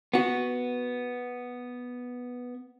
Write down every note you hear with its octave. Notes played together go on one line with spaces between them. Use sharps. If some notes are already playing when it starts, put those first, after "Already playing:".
B3 F#4